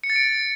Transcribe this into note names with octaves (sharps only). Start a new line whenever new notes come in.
C#7
A6
D7